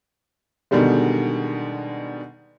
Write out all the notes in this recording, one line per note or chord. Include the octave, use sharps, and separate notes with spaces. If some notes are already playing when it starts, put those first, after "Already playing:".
B2 D3 D#3 G3 G#3